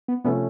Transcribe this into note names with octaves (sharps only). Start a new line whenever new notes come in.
B3
C3 F3 A3 B3 C#4